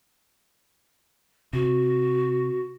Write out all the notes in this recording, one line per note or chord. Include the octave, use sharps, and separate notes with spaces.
C3 F#4